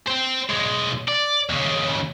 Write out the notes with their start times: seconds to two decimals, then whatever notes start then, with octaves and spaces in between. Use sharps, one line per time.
0.07 C5 G5
0.49 B1 G#3
1.08 D5
1.49 D#2 C#3